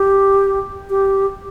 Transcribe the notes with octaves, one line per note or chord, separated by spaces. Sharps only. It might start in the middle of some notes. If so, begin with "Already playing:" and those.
Already playing: G4
G4